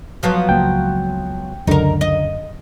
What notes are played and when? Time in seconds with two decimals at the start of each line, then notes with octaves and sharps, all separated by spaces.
0.23 F3 F#3 B3
0.49 C#2 A#3 G5
1.67 C#2 F#2 D3 D#4 A#4
2.01 D#5